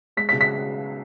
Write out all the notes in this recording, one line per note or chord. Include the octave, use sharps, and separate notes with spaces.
G#3 B6
B6
C#3
B6